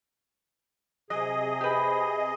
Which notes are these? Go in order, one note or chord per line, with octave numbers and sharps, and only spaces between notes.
C3 F#3 G#4 D#5
G4 B4